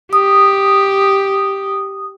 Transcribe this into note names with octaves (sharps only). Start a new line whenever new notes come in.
G4 D#6